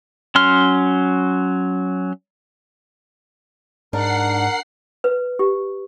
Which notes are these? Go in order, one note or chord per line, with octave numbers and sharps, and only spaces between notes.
F#3 C#4 C6 F6
G#2 D4 A#4 F#5 C7
B4
G4